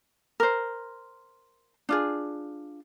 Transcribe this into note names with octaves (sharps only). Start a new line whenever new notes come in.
A#4 C5
D4 F4 G#4